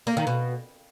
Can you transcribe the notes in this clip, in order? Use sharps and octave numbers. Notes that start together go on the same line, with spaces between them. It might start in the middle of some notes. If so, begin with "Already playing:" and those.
A#3
D#3
B2